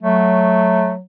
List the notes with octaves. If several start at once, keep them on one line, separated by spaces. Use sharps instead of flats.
F#3 A3